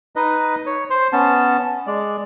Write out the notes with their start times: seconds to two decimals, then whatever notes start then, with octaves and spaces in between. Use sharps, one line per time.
0.16 D#4 B4 D#5
0.66 C#5
0.90 C5 C6
1.13 B3 C#4 A5
1.87 G#3 D5